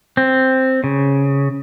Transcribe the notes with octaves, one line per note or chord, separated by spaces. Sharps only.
C4
C#3